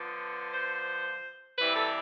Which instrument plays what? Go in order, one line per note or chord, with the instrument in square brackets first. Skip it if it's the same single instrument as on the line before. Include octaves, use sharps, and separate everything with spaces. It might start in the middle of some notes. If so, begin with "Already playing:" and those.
Already playing: [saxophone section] D3 F3 B3
C5
C3 E3 G3 C4 E4 B4
A4